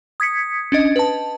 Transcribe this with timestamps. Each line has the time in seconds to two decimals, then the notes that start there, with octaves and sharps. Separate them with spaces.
0.20 D#6 G#6 B6 C#7
0.72 C#4 D4 D#5
0.96 B4 A5